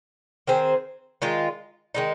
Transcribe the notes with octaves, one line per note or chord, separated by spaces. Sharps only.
D#3 C4 G#4 C5
D#3 G#3 F4
D#3 G#3 D#4